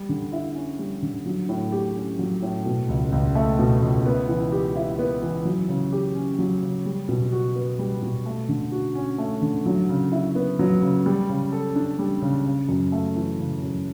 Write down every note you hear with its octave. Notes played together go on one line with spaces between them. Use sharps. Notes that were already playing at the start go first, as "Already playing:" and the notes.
Already playing: G3
D3
E4
C#4
G3
D3
F#3
A2
G4
C#4
F#3
A2
B2
C#2
C#2
A3
B2
C#2
B3
E3
G4
E4
B3
E3
F#3
C#3
G4
C#4
F#3
C#3
G3
B2
F#4
B3
G3
B2
A3
D3
F#4
C#4
A3
D3
F#3
C#3
E4
B3
F#3
C#3
G3
C#3
A4
D4
G3
C#3
C#3
F#2
A3
E3
C#3
F#2